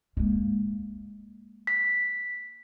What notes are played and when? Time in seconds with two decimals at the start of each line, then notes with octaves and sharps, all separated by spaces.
0.17 G#3 A#3
1.67 B6